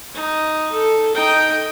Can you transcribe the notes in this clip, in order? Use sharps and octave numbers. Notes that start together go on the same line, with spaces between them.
D#4
A4
D#4 G5